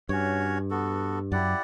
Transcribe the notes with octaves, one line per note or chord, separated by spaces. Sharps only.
G2 C#4 F#4 C#5
B3 F#4 A4
F#2 E4 G4 D5 F#5